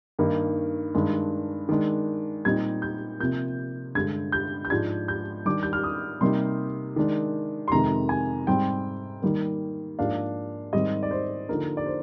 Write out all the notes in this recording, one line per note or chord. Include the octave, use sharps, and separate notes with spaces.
G2 D#3 A#3 D#4
G2 D#3 G#3 D4
D#3 G#3 D4
A#2 G3 C4 D#4 G#6
G6
C3 F3 A#3 G6
G2 D3 G#3 G#6
G6
G6
G#2 F3 G#3 D4 G#6
G6
D#3 G3 D4 D6
G6
F6
D#6
C3 G3 A#3 D#4 C6
D#3 G#3 D4
C6
F2 C3 D#3 G#3 A#5
G#5
G#2 G3 C4 G5
D#3 G3 A#3
G#2 F3 A#3 D4 F5
G#2 D#3 G3 C4 D#5
D5
C5
D3 F3 A#3 D#4 A#4
D5
C5